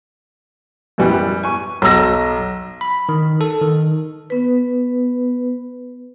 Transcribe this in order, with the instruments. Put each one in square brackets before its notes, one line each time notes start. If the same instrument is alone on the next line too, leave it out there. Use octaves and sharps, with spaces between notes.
[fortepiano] F#2 B2 E3 G3 B3
G#5 C#6
[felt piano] B1 A#5 E6 A#6
[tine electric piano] B5
D#3
A4
D#3
[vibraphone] B3 B4